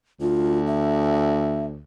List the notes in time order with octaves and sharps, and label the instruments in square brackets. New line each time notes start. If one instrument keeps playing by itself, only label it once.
[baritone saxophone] D2 [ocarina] F4
[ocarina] E5